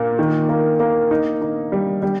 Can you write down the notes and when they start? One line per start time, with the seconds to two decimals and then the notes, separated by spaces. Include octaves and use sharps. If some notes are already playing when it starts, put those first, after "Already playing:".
Already playing: A#2 A#3
0.19 D#3
0.49 A#3
0.80 A#3
1.11 D#4
1.42 D#4
1.72 G3
2.02 G3